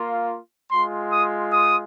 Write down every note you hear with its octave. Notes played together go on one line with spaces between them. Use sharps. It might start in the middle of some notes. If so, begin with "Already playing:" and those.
Already playing: A#3 F4
G#3 F4 C6
D#6
D#6